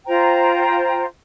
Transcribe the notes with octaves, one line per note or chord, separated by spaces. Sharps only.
F4 C5 G5 A#5